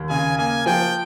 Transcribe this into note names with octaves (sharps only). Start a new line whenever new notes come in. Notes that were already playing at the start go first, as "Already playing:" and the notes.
Already playing: D#2
C#3 G#5
A#3 G#5
F3 G5